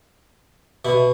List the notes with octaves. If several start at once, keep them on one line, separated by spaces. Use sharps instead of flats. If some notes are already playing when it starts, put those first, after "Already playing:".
B2 E4